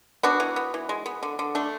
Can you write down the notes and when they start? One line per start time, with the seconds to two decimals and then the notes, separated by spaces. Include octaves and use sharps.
0.23 B3 D4 F#4
0.40 E3
0.56 B3
0.74 E3
0.89 G#3
1.06 B3
1.23 D3
1.39 D3
1.55 A3 D4